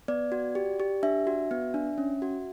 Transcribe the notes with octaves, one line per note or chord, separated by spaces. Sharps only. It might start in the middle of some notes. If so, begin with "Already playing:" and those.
B3 D5
F#4
G4
G4
D4 E5
F#4
B3
D4
C#4
F#4